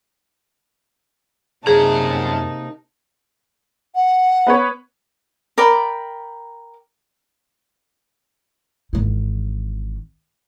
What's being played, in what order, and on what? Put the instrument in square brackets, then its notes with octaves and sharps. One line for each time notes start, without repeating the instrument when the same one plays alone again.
[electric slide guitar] F#2 A#5 [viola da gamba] C3 A#3 D#4 [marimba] G#4 [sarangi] A5
[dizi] F#5
[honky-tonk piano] B3 B4 C#5
[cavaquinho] A#4 D5 G5 B5
[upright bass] G#1 E3